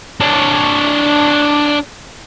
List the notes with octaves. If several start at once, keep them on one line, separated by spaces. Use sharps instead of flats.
D4 C#5